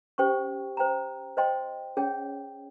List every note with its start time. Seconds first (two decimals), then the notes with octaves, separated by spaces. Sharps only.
0.18 C#4 G4 C5 G5 C#6
0.77 C5 G5 A#5
1.37 C5 D#5 G5 C6
1.97 C#4 G#4 C#5 G5